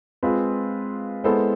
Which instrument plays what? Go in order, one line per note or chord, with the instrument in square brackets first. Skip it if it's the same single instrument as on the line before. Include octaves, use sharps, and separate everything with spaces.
[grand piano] G#3 C4 F4 G#4 B4
G#3 B3 E4 A4 C5